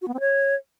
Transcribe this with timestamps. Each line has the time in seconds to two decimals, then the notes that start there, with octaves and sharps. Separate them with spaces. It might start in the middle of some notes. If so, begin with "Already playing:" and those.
0.02 F#4
0.08 B3
0.14 C4
0.20 C#5